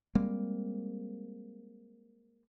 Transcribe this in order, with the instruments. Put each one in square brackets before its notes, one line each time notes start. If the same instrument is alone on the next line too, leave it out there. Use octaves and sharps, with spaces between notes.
[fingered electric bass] G3 G#3 A#3 C4